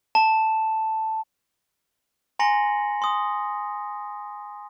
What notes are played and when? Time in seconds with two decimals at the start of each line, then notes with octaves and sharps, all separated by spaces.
0.15 A5
2.39 G#5 A#5 C6 A#6 C#7 F#7
3.02 C6 D#6